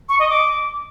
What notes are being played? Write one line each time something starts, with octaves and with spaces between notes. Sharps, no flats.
C#6
D#5
D6